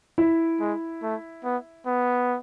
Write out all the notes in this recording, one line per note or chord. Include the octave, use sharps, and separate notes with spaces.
E4
G#3
A3
B3
B3